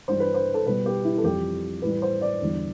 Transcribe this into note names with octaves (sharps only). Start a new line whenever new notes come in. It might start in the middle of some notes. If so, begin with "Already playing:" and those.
G2 E3 G3 C5
B4
C5
A4
B2 G3 B4
G4
E4
A4
F2 E3 G3 G4
A2 E3 G3 B4
C5
D5
E2 D3 G3